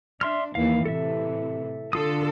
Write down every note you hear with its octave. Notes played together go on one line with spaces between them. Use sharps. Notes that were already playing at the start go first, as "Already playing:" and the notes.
D4 E5 C6 F6
D#2 E3 F5
A2 C3 E3 A4 E5
D3 F4 A4 D#6